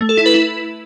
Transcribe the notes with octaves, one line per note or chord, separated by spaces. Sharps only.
A3
A4
E4
B4
E4